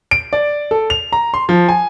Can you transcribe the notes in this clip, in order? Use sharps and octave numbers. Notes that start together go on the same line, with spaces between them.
D7
D5
A4
F7
A#5
C6
F3
G#5